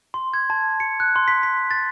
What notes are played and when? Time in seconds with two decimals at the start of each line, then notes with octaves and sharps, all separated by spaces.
0.14 C6
0.34 G#6
0.50 A5
0.80 C#7
1.00 F#6
1.16 C6
1.28 B6
1.43 B6
1.71 A6